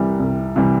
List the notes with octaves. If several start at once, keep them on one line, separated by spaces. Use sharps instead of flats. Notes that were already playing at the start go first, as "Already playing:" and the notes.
Already playing: C2 C3 E3 G3
C2
C3 E3 G3